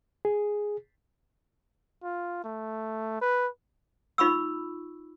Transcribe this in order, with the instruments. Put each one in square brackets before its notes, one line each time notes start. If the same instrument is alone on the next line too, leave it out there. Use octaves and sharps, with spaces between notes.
[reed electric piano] G#4
[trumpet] F4
A3
B4
[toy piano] D#4 F4 B5 C#6 E6